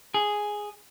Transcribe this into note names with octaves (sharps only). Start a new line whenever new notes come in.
G#4